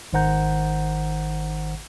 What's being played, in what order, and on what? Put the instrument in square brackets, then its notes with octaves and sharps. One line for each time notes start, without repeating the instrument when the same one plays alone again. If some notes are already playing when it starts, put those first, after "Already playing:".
[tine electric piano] G#1 D#3 C5 F#5 A#5 G6